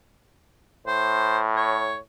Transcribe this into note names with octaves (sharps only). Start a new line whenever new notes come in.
A2 C5
C#5